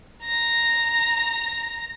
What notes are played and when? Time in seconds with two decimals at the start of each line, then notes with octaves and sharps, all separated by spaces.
0.25 A#5 A#6